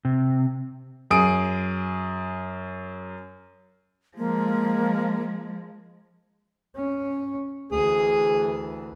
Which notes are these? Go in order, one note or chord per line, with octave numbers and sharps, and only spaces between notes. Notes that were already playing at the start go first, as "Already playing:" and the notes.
C3
F#2 G#4 D#6 D7
F3 G#3 A#3
C#4
D2 E3 G#4